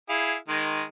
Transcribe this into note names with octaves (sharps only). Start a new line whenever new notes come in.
E4 G#4 F5
D#3 G#3